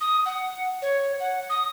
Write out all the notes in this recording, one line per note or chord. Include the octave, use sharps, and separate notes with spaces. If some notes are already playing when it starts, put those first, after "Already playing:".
D#6
F#5
C#5
F#5
D#6